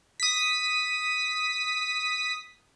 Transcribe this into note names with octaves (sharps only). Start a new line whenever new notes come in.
D#6 B6